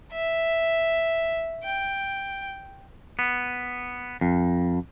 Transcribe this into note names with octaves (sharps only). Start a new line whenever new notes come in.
E5
G5
B3
F2